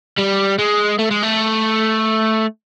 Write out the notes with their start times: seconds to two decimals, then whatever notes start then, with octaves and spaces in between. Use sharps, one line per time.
0.18 G3
0.58 G#3
0.99 A3
1.10 G#3
1.23 A3